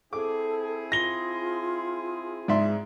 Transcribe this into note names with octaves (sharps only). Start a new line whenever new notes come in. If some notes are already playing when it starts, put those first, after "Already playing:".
C4 E4 G#4 A4 D6
F4 A#6 G7
G#2 D5 E5 C6